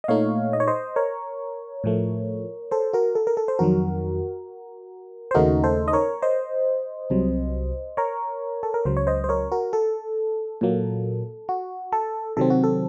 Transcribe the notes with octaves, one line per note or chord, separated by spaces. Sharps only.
D#5
A#2 A3 D#4 C#5 F5
D#5
C#5
C5 D#5
A#4 C#5
A2 F3 A3
A4 C5
F#4 A#4
A4
A#4
A4
C5
F2 D#3 F#3 F#4 A#4
C5
D#2 C#3 A3 D#4 F#4 A#4
A4 C5
D#5
A#4 C#5
C5 D#5
C2 C3 F#3
A#4 C#5
A4
A#4
C#2 C#3 F#3 C5
C#5
C5 D#5
C5
A#4 C#5
F#4 A#4
A4
A#2 F#3 A#3
F#4
A4
C3 D#3 F#3 C4 A4
F#4
A4